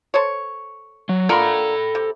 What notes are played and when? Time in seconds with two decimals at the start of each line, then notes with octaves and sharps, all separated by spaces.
0.14 A4 C5 C#5
1.09 F#3
1.29 D3 F4 A4 A#4 B5
1.95 C3